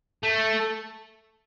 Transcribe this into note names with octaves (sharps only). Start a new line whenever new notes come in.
A3